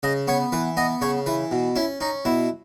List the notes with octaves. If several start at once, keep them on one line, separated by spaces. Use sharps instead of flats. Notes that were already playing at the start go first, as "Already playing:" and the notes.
C#3 D#5
B3 C#5
E3 B4
B3 D#5
C#3 C#5
E3 B4
B2
C#4 E4
C#4 D#4
B2 E4